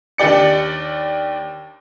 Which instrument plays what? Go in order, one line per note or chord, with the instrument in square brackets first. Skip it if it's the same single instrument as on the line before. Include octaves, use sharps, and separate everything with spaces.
[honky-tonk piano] D#2 D4 G4 D5 C#7